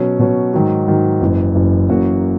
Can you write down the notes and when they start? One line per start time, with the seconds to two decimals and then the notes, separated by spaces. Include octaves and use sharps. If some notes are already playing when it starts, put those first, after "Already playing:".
Already playing: B2 F#3 C#4
0.19 B2 F#3 C#4
0.54 G#2 D#3 F#3
0.88 G#2 D#3 F#3
1.21 F#1 F#2 E3
1.55 F#1 F#2 E3
1.89 F#2 E3 A#3 C#4 F#4